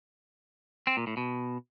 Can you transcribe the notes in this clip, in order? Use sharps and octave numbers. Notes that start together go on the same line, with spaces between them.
C4
A#2
A2
B2